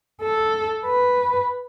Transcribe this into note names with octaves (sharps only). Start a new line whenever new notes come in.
A4
B4